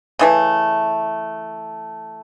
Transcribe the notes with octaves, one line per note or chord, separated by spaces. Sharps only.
C#3 E3 A3